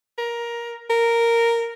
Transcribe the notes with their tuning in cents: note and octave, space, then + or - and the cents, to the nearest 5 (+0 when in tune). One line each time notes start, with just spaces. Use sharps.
A#4 +15
A#4 -5